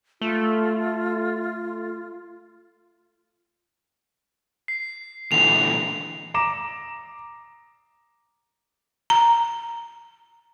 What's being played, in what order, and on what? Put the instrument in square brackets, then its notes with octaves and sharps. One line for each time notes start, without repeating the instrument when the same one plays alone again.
[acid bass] A3 [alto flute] F4
[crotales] C7
[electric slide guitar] A#2 D3 E3 [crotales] F7
[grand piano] A#5 D6 E7
[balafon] A#5